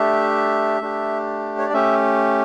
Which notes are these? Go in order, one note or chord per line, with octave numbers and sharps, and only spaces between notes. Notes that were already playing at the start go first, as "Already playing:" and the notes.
Already playing: A3 D4 G4 E5
A3 D4 G4
C#5
D5
A3 C#4 G4 E5